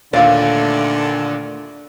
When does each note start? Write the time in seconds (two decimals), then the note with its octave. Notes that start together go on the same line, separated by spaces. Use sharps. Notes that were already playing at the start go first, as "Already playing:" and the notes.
0.13 D#2 A#2 D3 A3 D5 F5